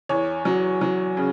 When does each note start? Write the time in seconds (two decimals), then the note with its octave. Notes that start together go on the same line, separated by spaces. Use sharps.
0.09 E2 C#5
0.45 F#3
0.81 F#3
1.17 C#3